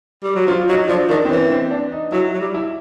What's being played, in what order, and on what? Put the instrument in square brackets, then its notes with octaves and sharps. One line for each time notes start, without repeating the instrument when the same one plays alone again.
[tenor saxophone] G3
F#3
[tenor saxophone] F3 [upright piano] F4
[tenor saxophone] F#3 [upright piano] D#4
[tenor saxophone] F3 [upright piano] D4
[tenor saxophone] D#3 [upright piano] D4
[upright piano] C4
[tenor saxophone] E3 [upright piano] C#4
[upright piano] C4
D4
D#4
[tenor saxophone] F#3 [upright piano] E4
[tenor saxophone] F#3
G3
[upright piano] E4